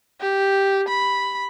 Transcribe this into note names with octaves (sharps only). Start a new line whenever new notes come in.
G4
B5